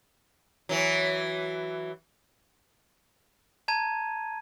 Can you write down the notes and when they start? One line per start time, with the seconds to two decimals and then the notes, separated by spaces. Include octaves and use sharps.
0.69 E3 F#3
3.68 A5 A#5 G#6 D#7